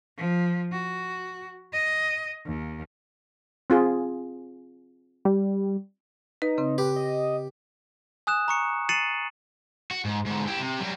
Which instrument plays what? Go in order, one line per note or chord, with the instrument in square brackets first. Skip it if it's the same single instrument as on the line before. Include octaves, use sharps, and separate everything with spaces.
[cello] F3
F#4
D#5
D#2
[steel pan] C4 F4 G#4
[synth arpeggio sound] G3
[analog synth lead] D#4 [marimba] B4
[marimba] C#3 C4
[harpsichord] G4 [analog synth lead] B4
[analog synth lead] D#5
[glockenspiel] G#5 D#6 F#6 E7
A#5 C#6 C#7
A6 C7 C#7 D#7 E7 F#7
[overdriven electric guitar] F#4
G#2
G#2 D3
E4 G4
C3
F#3 G3